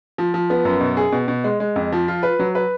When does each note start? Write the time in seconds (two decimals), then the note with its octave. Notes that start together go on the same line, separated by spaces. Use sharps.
0.18 F3
0.34 F3
0.50 B3
0.65 F#2
0.81 B2
0.97 G#4
1.12 B2
1.28 B2
1.44 G#3
1.60 G#3
1.76 F2
1.92 F3
2.08 F4
2.23 B4
2.39 F#3
2.55 B4